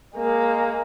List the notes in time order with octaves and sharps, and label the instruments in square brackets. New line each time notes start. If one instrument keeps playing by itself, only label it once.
[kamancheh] G#3 A#3